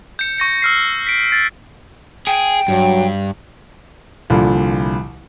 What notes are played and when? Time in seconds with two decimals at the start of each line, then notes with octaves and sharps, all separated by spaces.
0.19 G6 C#7
0.38 C#6 A#6 C#7
0.62 E6 F6 C7
1.07 B6 D7
1.32 A6
2.27 G#4 G5
2.68 G2 F#3
4.30 C2 A#2 D3 F3